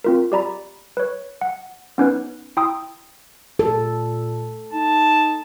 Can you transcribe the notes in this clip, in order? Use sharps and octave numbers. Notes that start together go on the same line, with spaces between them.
C4 F4 A#4
G4 D5 A#5 B5
B4 C#5
F#5
B3 C#4 D#4 B4
E4 G5 A#5 C6 D#6 E6
A#2 A4
D#4 A5